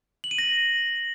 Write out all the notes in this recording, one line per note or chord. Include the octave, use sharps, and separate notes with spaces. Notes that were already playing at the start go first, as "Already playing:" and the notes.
F#7
D#7
A#6